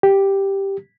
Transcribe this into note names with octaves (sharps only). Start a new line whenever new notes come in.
G4